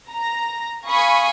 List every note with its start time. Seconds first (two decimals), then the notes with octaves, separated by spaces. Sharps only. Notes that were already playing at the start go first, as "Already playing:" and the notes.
0.13 A#5
0.87 F5 G#5 B5 C#6 D#6